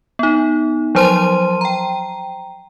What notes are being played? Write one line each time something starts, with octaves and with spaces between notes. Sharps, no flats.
B3 D#4
F3 F#3 C5 A5 C6 D#7
G5 A#5